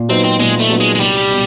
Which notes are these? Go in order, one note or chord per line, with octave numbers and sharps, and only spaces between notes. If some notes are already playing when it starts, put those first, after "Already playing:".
Already playing: A#2
F#3 B3 C4 D#4
C4
A#2 G#3
A3
F#3 B3 D#4
G#3
G#3
C2 G3
B2